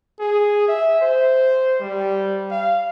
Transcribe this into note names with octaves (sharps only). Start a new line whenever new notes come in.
G#4
E5
C5
G3
F5